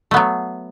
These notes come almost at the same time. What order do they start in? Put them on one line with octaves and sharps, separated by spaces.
A3 B3 F#3